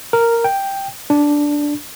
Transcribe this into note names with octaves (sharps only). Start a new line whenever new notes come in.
A#4
G5
D4